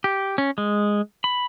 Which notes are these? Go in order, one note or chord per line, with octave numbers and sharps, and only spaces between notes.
G4
C#4
G#3
B5